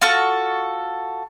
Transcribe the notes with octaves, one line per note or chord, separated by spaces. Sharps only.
F4 F#4 A4 C#6